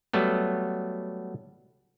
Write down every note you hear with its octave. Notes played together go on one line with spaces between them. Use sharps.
F#3 G3 A3 B3